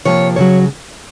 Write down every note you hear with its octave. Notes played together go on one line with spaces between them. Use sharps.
C3 F3 A#3 C#5
C#3 F#3 C#5